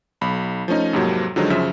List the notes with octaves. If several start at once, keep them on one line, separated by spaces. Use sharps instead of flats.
B1 B5
F3 A3 C#4 D#4
F2 G#2 C3 F3 F#3 A#3
D3 D#3 F3 F#3 G#3 D#4
F#2 C#3 F3 E5